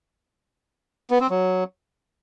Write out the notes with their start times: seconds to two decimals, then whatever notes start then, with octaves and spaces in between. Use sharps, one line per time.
1.10 B3
1.20 C4
1.30 F#3